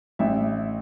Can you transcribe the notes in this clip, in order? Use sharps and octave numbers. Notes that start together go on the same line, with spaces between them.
A1 E5